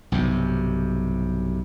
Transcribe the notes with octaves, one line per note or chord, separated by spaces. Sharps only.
B1 G2 C3